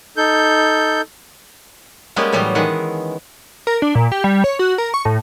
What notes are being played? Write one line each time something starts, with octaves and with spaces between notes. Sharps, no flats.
D#4 A4 G6
G3 G#3 A#3 B3 C#4 G4
A2 E3 F#3 G3 B3
D#3 E3 G#3 F#5
A#4
D4
A#2
G4
G3
C#5
F#4
A#4
C#6
A2